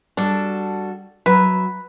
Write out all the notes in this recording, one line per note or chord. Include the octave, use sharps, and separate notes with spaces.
G3 D4 F#4 A4
F#3 B4 E5